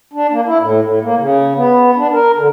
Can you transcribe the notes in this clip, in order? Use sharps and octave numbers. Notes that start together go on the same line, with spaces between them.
D4
A#3
E4
A2
A2
A#3
C#3
B3
D4
A#4
D3